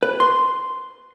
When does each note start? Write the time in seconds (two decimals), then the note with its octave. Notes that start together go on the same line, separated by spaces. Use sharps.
0.03 B4
0.20 C6